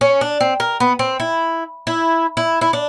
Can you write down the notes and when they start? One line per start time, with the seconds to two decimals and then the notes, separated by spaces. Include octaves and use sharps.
0.01 C#4
0.21 D4
0.41 C4
0.60 A#4
0.80 B3
0.99 C4
1.20 E4
1.87 E4
2.37 E4
2.61 E4
2.73 D4